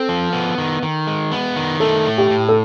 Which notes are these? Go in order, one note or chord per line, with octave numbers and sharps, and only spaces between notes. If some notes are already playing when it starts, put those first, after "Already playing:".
Already playing: C4 A4
F3
B3
D#3
D#3
G#3
B3
D#3
A3 A4
A2
G4
A2
A4